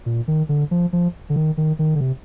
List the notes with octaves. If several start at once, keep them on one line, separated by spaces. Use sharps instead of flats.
A#2
D#3
D3
F3
F3
D3
D#3
D#3
D#3
D3
C3